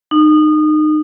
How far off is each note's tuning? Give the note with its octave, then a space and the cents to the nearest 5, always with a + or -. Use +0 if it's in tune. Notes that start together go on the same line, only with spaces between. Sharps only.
D#4 -25